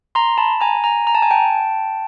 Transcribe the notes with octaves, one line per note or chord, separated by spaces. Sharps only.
A#5 C6
A5 B5
G#5 A#5
G#5 A#5
A#5
A5
G#5
G5 A5